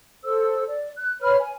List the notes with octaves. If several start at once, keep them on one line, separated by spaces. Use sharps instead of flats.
A4 C5 E6
D5
F#6
B4 C#5 B5 F6
G#5